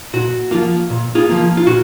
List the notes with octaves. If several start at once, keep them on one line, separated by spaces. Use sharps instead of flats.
A#2 F#4
F3 A#3 F4
A#2
F4 G#4
F3 A#3
F4
A#2 F#4